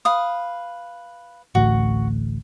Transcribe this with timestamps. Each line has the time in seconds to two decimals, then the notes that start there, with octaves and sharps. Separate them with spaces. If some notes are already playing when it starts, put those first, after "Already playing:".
0.05 B4 F5 D#6
1.55 A1 D2 A2 F#4